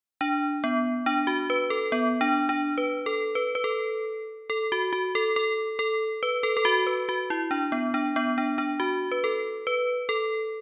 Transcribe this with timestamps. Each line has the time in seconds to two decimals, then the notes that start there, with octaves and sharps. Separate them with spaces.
0.21 D4
0.64 B3
1.06 D4
1.27 F#4
1.50 B4
1.70 A4
1.92 B3
2.21 D4
2.49 D4
2.78 B4
3.06 A4
3.35 B4
3.55 B4
3.64 A4
4.50 A4
4.72 F#4
4.93 F#4
5.15 A4
5.36 A4
5.79 A4
6.23 B4
6.43 A4
6.57 A4
6.65 F#4
6.87 B4
7.09 F#4
7.30 E4
7.51 D4
7.72 B3
7.94 D4
8.16 B3
8.38 D4
8.58 D4
8.80 F#4
9.12 B4
9.24 A4
9.67 B4
10.09 A4